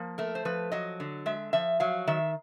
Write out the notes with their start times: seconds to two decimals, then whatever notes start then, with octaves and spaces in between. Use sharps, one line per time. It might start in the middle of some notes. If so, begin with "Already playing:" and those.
Already playing: F3 A#3
0.18 A3 A#4
0.35 C5
0.45 F3 B4
0.72 F#3 D#5
1.00 D3
1.26 G#3 E5
1.53 F3 E5
1.80 F#3 F5
2.07 D#3 E5